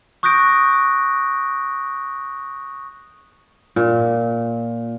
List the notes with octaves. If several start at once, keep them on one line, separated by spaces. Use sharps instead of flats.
C#6 D#6 F#6 G6 A#6 D7
A#2